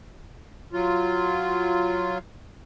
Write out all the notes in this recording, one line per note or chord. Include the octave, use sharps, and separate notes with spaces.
F#3 F4